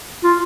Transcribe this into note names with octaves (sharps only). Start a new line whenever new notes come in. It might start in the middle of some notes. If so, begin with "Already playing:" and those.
F4